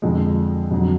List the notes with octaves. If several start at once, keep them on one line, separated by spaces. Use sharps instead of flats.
F2 D3 F3 G#3
F2 D3 F#3